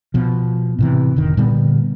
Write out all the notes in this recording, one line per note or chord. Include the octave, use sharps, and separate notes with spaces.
B2 F3
A2 C3 E3
F1 D3 D#3
A#2 D3 G3 B3